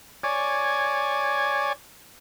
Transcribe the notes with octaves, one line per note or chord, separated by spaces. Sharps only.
C#5 D5 G#5